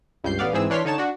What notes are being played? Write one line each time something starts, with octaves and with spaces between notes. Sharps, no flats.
C#2 G2 G6 C7
A1 B3 D5 F5
G#2 E3 C4 G#4 E6
E3 D4 C#5 C6 F6 B6
D3 D#4 C#5 A5 E7
D4 F#4